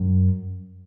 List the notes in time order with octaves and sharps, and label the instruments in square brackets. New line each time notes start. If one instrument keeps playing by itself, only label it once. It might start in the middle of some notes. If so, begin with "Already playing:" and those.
Already playing: [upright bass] F#2